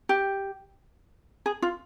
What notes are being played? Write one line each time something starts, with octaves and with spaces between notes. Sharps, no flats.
G4
G#4
F4